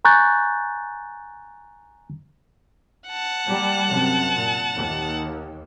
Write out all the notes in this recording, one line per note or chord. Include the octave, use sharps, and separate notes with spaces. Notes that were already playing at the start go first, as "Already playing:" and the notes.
G#5 A#5 C#6 F#6 G6 A6
F#5 A5
G3 A#3
F#2 C3
A#2
D#2